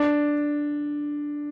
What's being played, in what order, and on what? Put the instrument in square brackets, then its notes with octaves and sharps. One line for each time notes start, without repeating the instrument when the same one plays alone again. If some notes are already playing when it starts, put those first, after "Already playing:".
Already playing: [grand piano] D4